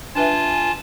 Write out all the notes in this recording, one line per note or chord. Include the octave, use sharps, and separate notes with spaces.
D4 F4 B4 E5 G#5 A5